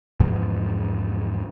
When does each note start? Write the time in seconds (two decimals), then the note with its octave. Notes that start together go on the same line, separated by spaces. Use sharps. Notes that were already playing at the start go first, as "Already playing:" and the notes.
0.20 E2 G#2 C#3 F3